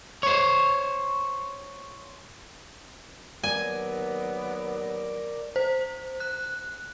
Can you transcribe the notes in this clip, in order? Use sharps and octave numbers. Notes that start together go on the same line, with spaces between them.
C5 C#5
D#2 F#3 B3 A#4 D5 G#5
C5
F#6